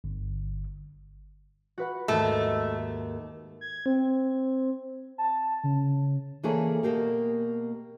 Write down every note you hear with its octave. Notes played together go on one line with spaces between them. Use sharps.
G1
F#4 B4 F#5
D#2 G#2 A3
G#6
C4
A5
C#3
E3 A#3 G#4 A4 C#5 D5
B2 A#3 G4 A#4